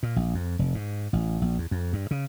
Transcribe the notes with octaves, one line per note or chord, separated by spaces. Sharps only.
A#2
A#1
F2
F1
G#2
A1
A#1
E2
F2
G2
C#3